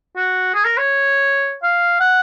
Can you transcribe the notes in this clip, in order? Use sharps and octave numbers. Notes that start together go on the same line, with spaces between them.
F#4
G#4
A#4
C#5
F5
F#5